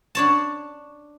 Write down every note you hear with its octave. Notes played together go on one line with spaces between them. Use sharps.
D4 C#5 A5